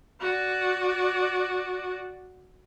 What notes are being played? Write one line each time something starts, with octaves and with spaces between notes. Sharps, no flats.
F#4 D5